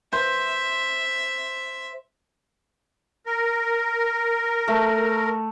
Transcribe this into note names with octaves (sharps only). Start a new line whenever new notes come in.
C5 E5
A#4
A3